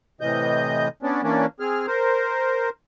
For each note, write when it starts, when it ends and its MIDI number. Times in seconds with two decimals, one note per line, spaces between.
0.21 0.88 45
0.21 0.88 48
0.21 0.88 52
0.21 0.88 75
0.21 0.88 91
1.03 1.22 59
1.03 1.22 61
1.03 1.22 62
1.23 1.46 52
1.23 1.46 58
1.23 1.46 61
1.23 1.46 62
1.60 1.86 60
1.60 1.86 68
1.60 1.86 89
1.87 2.69 70
1.87 2.69 72